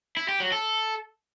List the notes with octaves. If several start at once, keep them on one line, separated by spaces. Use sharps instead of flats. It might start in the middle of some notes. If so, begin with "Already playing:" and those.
E4
G4
F#3
A4